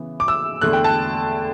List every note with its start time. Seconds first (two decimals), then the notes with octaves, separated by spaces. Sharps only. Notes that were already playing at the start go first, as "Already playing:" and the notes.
Already playing: C#3 E3 B3
0.20 D6
0.28 E6
0.61 E2 D3 A3 F#6
0.73 G5
0.84 A5